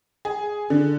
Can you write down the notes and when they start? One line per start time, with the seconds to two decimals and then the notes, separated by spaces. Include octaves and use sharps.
0.25 G#4
0.70 D3